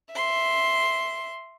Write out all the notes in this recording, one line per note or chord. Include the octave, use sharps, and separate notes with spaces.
E5 C6